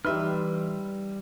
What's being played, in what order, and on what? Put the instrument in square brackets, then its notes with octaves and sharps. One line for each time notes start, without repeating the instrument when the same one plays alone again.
[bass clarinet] E3 [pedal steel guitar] G3 C6 F6 [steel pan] D#4 G4 [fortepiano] B4 E5